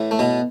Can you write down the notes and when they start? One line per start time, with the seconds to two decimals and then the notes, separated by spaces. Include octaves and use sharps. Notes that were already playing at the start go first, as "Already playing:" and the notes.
Already playing: A2 E3
0.11 A3
0.19 B2 B3